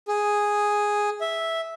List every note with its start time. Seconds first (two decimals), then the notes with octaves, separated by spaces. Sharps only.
0.08 G#4
1.21 E5